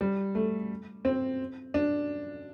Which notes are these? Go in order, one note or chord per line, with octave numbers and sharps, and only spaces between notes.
G3
A3
C4
D4